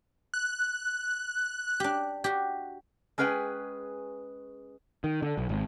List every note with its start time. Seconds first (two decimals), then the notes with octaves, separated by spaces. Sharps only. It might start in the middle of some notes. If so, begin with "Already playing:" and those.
0.34 F#6
1.80 D4 G4
2.24 F#4 G4
3.18 G#3 C#4 G#4 B4 G5 G#5
5.04 D#3
5.22 D3
5.38 B1
5.49 G#1